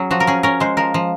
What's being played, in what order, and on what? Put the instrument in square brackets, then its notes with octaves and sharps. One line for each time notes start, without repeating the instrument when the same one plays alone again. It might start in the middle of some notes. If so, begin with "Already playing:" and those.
Already playing: [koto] F#3 C#4 G#4
F3 F#4
A#4
C#4 G#4
C#4 A#4
G#3 C5
F3 A#4
F3